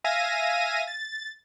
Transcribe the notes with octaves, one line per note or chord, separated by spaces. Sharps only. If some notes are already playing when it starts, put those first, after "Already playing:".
E5 F5 G#5 A#6 D#7
A6